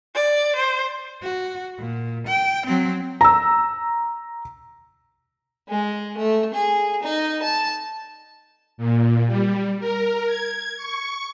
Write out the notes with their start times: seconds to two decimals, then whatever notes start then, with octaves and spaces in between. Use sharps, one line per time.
0.15 D5
0.56 C5
1.23 F#4
1.79 A#2
2.27 G5
2.66 F#3 C4
3.21 A#5 E6
5.68 G#3
6.17 A3
6.54 G#4
7.02 D#4
7.42 A5
8.78 A#2
9.27 G3
9.80 A#4
10.27 G#6
10.77 C#6